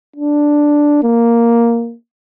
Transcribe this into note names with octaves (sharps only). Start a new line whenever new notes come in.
D4
A#3